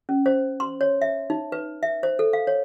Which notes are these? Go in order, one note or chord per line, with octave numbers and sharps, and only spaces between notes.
C#4
C5
C6
C#5
E5
D#4
B4
E5
C5
A4
F5
C#5